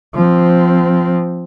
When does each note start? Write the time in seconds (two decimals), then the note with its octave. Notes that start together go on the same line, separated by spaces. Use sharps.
0.15 F3 C4